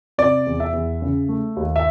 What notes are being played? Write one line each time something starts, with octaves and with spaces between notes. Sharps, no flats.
C3 D5
E2
E5
E2
C#3
A3
D#2
E5